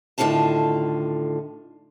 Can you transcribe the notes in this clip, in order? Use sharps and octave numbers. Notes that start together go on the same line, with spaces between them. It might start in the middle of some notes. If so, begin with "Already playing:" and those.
A2 D3 D#3 C#4 F4 A5